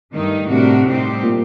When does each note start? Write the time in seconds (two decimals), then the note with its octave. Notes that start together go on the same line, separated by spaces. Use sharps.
0.13 G2 D#3 A3 D#4
0.50 A2 C3 G3 D4 F#4 A#4
0.86 A2 G3 C4 D#4 G4
1.23 A#2